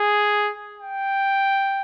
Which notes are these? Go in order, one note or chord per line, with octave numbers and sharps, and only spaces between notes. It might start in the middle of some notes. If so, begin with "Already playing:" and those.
Already playing: G#4
G5